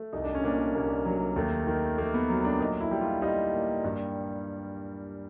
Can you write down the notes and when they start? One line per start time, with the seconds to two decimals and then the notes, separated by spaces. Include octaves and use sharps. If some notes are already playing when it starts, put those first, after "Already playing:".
Already playing: A3
0.13 C2 D#4
0.24 D4
0.35 C#4
0.44 A#2 D4
0.74 C2 A#3
1.05 F#3
1.36 D#2 A3
1.67 D#3
1.98 A3 A#3
2.14 B3
2.29 F#3
2.44 D4
2.60 A#2 D#4
2.81 E4
2.91 G3
3.01 F4
3.22 G3 D#4
3.53 A#2
3.84 G2